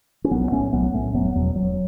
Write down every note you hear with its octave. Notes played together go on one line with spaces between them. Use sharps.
C#4
B1 F#3 B3
A2 A3 C#4
B1 F#3 B3
A2 A3 C#4
E1 F#3 B3
E2 B2 F#3
E1 F#3